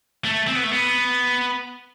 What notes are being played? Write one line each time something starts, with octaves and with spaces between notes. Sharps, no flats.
A3
C4
B3
A3
B3